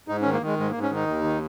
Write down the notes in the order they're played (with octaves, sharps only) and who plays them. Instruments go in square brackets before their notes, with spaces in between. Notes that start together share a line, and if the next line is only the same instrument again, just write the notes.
[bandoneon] G#2 D#4
C#4
D#3
A#3
D#3 G#3
G#2 G#3
A#3
G#2
C#4
D#3 D#4
D#2
D#3